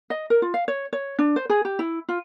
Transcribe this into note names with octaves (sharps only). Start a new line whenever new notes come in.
D#5
A#4
F4
F5
C#5
C#5
D4
C5
G#4
G4
E4
F4